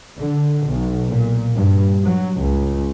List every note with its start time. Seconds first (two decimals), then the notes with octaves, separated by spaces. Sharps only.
0.19 D3
0.67 B1
1.07 A#2
1.55 G2
2.03 F#3
2.38 C#2